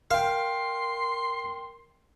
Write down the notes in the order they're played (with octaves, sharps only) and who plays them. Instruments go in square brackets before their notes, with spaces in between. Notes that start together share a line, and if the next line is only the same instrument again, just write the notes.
[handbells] A#4 G5 [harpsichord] F5 [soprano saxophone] C6